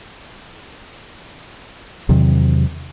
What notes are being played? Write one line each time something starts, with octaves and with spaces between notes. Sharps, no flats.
E2 C3 D#3 F#3